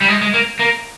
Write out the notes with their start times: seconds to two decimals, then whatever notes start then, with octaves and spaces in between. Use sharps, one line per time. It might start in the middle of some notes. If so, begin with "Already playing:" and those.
0.01 G3
0.08 G#3
0.21 G#3
0.34 A#3
0.59 A#3